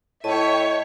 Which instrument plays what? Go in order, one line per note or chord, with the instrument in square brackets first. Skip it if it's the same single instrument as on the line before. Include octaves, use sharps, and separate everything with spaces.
[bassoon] A2 [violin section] C#5 E5 G5 [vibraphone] D#5 A5